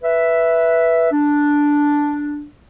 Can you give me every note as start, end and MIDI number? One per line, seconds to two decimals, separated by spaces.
0.03 1.10 71
0.03 1.10 76
1.11 2.45 62